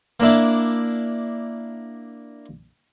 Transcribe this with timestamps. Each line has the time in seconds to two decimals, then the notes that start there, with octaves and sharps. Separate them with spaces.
0.20 A#3 D4 E4